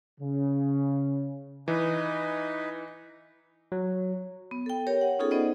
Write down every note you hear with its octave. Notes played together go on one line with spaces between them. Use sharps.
C#3
E3 D#4 B4
F#3
B3
A4 G5
G4 A#4 C#5
F#5
B3 C#4 D#4 F4 G#4 A4
B3 D#4 C5 D5 D#5 F#5